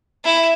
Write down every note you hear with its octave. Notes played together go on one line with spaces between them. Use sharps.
E4